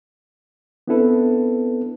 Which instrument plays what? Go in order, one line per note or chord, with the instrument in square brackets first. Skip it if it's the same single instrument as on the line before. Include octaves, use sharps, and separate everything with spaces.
[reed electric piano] B3 C4 D4 E4 A4 B4